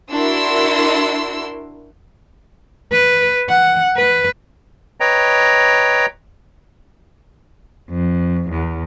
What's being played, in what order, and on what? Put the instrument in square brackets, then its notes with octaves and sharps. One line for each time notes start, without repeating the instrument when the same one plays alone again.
[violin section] D4 E4 F#4 A#4 C6 E6
[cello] B4
F#5
B4
[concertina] B4 C#5 D#5 G5 A#5
[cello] F2
E2